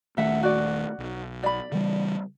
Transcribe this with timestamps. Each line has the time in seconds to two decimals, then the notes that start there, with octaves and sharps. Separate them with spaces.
0.17 D#1 D#3 A3 A4 E5 F#5
0.43 F#4 D5
0.98 B1
1.43 D5 B5
1.72 C#3 E3 G3